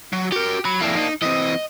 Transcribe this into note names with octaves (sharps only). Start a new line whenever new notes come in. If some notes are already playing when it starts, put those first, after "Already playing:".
F#3
F#4 G4 A#4
F#3 B5
F2 A#3 D4 E4
D#4
E3 C4 D#5